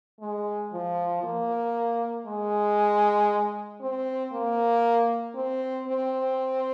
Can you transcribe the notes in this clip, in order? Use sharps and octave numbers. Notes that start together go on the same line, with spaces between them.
G#3
F3
A#3
G#3
C4
A#3
C4
C4